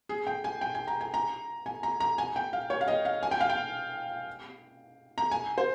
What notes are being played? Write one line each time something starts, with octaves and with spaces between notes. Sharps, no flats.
G#4
G5
G#5
G5
G#5
A#5
G#5
A#5
G#5
A#5
A#5
G#5
G5
F5
C#5
F5
D#5
F5
G#5
G5
F5
G5
A#5
G#5
C5